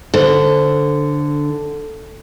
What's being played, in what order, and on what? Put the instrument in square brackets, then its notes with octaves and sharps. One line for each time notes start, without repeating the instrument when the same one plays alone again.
[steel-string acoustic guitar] D3 [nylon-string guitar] A4 C5